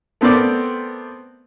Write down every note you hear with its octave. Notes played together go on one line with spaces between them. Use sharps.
A3 B3 C4 A#4 D5